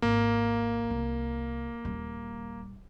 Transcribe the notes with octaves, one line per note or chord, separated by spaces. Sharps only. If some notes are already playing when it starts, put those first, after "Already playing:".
G#1 A#3
C2
D#1 G3